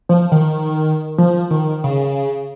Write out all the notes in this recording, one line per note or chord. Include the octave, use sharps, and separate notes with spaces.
F3
D#3
F3
D#3
C#3